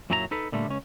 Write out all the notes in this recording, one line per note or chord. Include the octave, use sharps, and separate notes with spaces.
F#2 A#2 F#3 E4 G#4 A#5
D#4 A4 B4
A#2 D3 G3 A3
C#2 C#4